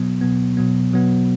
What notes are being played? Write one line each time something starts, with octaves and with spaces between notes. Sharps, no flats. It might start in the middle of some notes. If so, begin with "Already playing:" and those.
Already playing: B2 F#3 B3
B2 F#3 B3
B2 F#3 B3
B2 F#3 B3